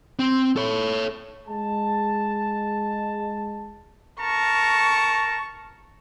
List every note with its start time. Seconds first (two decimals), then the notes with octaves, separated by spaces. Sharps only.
0.19 C4
0.56 A4 C#5
1.48 G#3 A5
4.20 A#4 A5 A#5 C#6